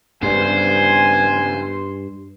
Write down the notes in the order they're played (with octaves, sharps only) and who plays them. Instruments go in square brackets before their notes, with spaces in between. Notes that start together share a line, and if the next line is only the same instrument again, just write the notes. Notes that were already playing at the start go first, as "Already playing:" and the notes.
[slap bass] G2 [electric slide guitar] C#3 G3 B3 [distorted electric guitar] C5 [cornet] G#5